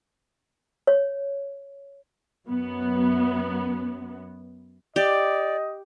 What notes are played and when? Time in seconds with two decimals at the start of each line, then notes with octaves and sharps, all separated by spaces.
0.87 C#5
2.47 F#2 F#3 B3
4.96 G4 D5 D#5